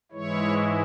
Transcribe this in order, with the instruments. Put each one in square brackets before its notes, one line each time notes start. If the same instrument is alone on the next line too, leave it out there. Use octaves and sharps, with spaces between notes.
[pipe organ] G#2 E3 G#3 E4 C#5